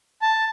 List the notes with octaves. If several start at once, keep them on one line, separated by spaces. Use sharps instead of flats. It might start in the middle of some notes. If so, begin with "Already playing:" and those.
A5